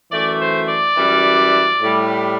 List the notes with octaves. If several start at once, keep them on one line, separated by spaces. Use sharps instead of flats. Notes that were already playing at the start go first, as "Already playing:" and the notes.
F#2 E3 A3 D5
C5
D5
F#2 E3 G3
A2 G3